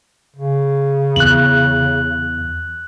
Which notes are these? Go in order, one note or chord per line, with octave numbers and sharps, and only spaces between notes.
C#3
E2 F#6 F#7